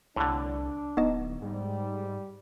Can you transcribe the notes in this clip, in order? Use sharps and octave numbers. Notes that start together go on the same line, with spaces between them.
C2 A2 D3 D4
D1 B3 D#4 D#5
G#2 G3